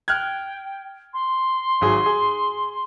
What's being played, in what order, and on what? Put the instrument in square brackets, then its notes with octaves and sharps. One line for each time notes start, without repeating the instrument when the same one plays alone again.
[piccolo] G5 [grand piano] F6 F#6 G#6
[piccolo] C6
[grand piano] G#1 F#3 G#4
G#4